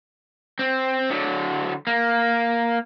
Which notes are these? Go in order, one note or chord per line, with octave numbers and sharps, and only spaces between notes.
C4
D3 F#3
A#3